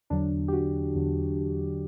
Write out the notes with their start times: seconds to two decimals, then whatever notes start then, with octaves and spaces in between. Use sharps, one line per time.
0.10 E2 D3 F#3 D4
0.48 G4
0.53 F#4
0.95 E2 D3 F#3